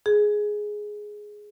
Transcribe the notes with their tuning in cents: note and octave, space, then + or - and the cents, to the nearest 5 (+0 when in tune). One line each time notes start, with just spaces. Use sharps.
G#4 +5